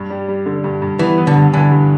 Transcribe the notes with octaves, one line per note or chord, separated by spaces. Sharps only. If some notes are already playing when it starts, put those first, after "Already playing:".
Already playing: G2
G3
G3
D3
G2
G2
E3 B3
B3
D3
G2
D3 E3
G2